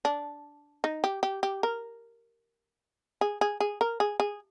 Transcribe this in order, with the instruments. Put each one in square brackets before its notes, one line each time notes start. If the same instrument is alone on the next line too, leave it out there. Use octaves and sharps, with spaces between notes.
[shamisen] D4
D#4
G4
G4
G4
A#4
G#4
G#4
G#4
A#4
G#4
G#4